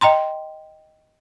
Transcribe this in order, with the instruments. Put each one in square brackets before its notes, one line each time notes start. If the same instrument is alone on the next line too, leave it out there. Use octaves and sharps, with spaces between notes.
[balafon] D#5 G5 A#5 C6